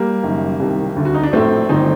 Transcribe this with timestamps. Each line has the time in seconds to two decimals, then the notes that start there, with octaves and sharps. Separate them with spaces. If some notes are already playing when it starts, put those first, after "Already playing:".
Already playing: G3 A#3
0.23 F#1 F#2 D#3
0.60 C2 C3 D#3
0.96 D2 D3
1.05 F#4
1.14 D#4
1.23 D4
1.32 A#1 A2 A3 C4
1.69 G1 D#3 C4 D#4